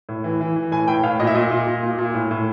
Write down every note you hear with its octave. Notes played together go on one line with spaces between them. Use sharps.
A2
E3
E3
E3
A2 G#5
A2 G5
A2 F5
A#2 D#5
E5
A#2 D#5
A#2
A#2
A#2
A#2
A2
A2